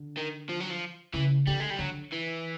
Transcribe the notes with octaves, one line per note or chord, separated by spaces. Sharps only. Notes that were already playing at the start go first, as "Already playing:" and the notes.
Already playing: D3
D#3
F3
F#3
F3
C#3 E3
D3 G3
G#3
G3
D3 F#3
E3